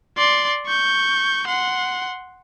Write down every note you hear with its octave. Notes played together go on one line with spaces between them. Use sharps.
D5 C6
C#6 G6
F#5 C6